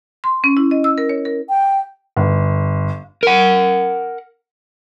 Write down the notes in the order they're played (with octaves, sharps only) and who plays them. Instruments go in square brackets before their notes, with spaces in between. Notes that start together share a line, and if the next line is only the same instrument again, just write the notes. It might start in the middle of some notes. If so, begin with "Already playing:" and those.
[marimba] C6
C#4
E4
D#5
E6
A#4
C#5
A#4
[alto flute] G5
[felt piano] G1
[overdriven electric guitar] A#4 F#5